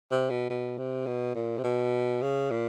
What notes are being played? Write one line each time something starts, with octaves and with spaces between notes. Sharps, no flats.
C3
B2
B2
C3
B2
A#2
C3
B2
C#3
A#2